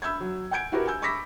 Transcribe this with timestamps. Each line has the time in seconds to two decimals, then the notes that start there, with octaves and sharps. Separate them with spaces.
0.02 B5 E6 G6 G#6
0.20 F#3
0.51 F#5 G#5 G6 G#6 D7
0.72 E4 F#4 G4 A#4 B4
0.87 G#5 E6 G6
1.02 B5 C#6 D6 E6 A#6 B6